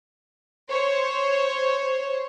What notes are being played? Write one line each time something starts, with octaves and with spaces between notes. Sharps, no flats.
C5 C#5